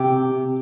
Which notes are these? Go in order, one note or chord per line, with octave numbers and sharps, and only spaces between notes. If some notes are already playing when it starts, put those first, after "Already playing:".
Already playing: C3 G4